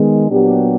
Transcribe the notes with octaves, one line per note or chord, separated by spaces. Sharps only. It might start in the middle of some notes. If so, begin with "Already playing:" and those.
Already playing: D#3 G#3 B3
A#2 F#3 B3 D4 G4